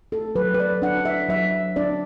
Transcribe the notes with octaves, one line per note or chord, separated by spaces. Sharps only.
A4
F#3 B4
B4
D5
D4 F#5
E5
F#3 E5
D4 D5